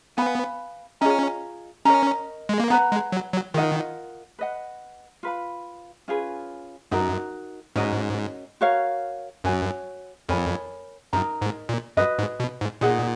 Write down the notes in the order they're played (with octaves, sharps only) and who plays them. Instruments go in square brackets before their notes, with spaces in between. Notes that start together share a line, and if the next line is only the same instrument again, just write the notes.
[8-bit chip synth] B3 [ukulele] B4 F5 G#5 B5
[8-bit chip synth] C#4 [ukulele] F4 G#4 D#5 A#5
[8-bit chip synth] C#4 [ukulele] A#4 D#5 A#5
[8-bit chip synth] G#3
A#3
[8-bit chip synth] B3 [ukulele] B4 F#5 A#5
[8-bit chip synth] G#3
F#3
F#3
[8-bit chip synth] D#3 [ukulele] F4 A#4 D#5 F#5
[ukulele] B4 D#5 F#5
F4 B4 F5 B5
C#4 F4 G#4 B4
[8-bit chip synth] F#2 [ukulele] D#4 F#4 A#4
[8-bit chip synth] G#2 [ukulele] C#4 F#4 A#4 D#5
[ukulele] F#4 A#4 C#5 F5
[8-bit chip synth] F#2 [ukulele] F#4 C#5 G#5
[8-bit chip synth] F2 [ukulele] A#4 C#5 G#5 B5
[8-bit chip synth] F#2 [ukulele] D#4 A#4 D#5 A#5
[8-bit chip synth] G#2
A#2
[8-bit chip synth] F#2 [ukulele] F#4 B4 D#5
[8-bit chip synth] G#2
B2
G#2
[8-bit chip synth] A#2 [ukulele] D#4 G#4 D#5 F#5